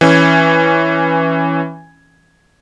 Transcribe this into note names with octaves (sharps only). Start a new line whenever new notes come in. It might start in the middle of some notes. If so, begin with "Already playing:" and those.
E3 C#4 G#6